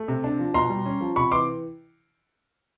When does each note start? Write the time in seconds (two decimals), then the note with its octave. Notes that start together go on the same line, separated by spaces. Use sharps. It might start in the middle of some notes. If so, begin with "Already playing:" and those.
Already playing: A3
0.08 C3
0.24 D4
0.39 F3
0.54 B2 A#5 C6
0.70 G3
0.86 C#4
1.01 F3
1.16 C3 B5 C#6
1.32 E3 C6 D6